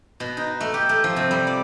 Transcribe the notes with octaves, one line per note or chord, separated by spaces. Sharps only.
B2
D#4
A3
G4
A3
F3
C3
G3
D5